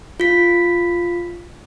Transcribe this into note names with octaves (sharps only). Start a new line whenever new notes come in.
F4 B6